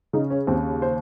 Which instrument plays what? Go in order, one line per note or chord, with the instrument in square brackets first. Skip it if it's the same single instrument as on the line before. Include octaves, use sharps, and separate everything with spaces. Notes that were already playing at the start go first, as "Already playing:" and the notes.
[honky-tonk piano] C#3 D#4
C#4
D#2 C4
C5